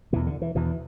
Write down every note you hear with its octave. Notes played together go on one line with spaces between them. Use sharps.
E2 B2 E3
D3
E3
E2 B2 E3